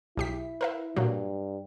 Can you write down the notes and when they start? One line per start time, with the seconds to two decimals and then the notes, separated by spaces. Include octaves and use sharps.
0.17 B1 E4 G4 B6
0.61 A#4 B4 E5
0.96 G2 A#2 F#3